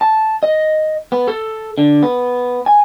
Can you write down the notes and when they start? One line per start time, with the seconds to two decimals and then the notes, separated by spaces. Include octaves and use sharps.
0.01 A5
0.43 D#5
1.12 B3
1.28 A4
1.78 D3
2.03 B3
2.66 G#5